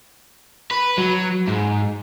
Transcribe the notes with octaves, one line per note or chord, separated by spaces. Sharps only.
B4
F#3
G#2